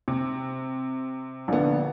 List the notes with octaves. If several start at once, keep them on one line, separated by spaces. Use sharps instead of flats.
C3
A#1 D3 B3